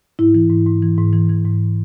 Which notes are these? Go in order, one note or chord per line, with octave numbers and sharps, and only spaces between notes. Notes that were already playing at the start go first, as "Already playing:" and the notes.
G#2 E4
E3
G#2
G#2
E3
G#2
E3
E3
G#2